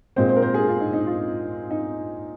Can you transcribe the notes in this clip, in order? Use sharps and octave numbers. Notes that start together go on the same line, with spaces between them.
A#2 G#3 C4 C5
C5
A#4
C5
G#4
F4
D#4
D#4
F4
D#4